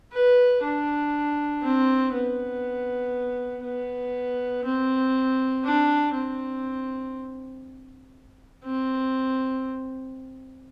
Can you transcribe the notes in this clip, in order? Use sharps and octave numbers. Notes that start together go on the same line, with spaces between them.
B4
D4
C4
B3
B3
C4
D4
C4
C4